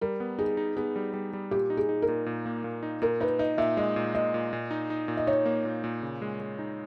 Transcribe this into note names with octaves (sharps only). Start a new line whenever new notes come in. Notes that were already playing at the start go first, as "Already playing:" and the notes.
G3 A#4
B3
D#4 G#4
D#4
B3 G#4
G3
G3
G3
A#2 G4
D#4
G#4
D#4
A#4
A#2
A#2
A#3
A#2
D#4
A#2 A#4
D#4 B4
D#4 D#5
A#2 E5
G#3 D#5
A#2
A#2 D#5
A#2
A#2
D#4
D#4
A#2
D#5
D#4 C#5
A#3
A#2
A#2
C#3
G#3
G#3
D#4